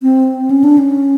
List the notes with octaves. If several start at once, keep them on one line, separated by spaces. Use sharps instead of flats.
C4
C#4
D4
C#4